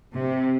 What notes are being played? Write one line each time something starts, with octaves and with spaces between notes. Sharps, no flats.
C3